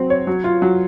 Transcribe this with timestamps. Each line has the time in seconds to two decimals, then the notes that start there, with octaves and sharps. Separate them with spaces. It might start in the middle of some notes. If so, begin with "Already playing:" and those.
Already playing: F#3 C4 F#4
0.10 C#5
0.27 F#3
0.44 F4
0.62 F#3